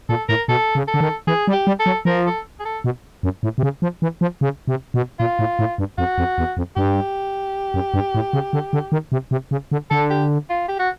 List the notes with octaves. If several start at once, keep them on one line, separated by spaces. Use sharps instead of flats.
A#2 A4
A2 A#4
B2 A4
C#3
A4
D3
D#3
E3 G#4
G3
G4
G3
A4
F#3
F3 A#4
A4
G#4
A4
B2
F#2
A2
C3
C#3
F3
E3
F3
C#3
C3
B2
A#2 F4
A2
A2
G2
F2 F#4
F2
E2
F2
G2 G4
F#2
G2
A2
C#3
D3
D3
D#3
C3
C3
C#3
D3
D3 A4
G4
F4
G4
F#4